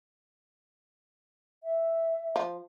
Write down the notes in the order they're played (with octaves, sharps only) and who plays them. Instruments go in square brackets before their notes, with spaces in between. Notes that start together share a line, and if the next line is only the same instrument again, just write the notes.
[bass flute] E5
[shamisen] F3